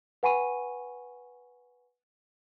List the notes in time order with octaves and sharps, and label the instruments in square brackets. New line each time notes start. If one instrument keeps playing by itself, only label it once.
[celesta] B4 F#5 G#5 B5 C#6 D#7